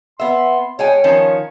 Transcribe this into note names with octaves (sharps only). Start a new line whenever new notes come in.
B3 E5 C6
G#3 C#5 G5 G#5
D#3 F3 C#4